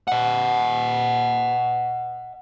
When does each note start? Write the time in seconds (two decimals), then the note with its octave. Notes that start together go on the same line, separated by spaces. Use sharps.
0.08 D#5 F#5